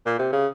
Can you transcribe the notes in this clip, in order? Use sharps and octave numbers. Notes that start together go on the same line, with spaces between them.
A#2
C3
C#3